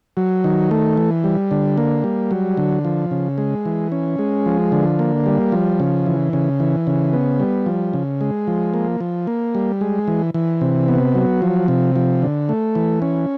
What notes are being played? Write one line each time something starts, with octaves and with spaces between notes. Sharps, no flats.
F#3
D#3
A3
E3
G3
D3
A#3
G3
F#3
D3
F3
C#3
G#3
E3
C#4
G#3
F3
D3
A#3
G3
F3
C#3
E3
C#3
E3
C#3
B3
G3
F3
C#3
G#3
F3
A#3
F3
A#3
G3
G#3
E3
E3
C3
B3
F#3
F3
C3
F3
D3
A3
E3
C#4